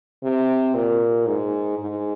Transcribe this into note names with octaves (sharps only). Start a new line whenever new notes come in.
C3
A#2
G#2
G#2